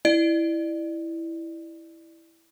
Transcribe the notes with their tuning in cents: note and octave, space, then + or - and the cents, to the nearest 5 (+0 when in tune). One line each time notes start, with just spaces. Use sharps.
E4 +0 D5 +30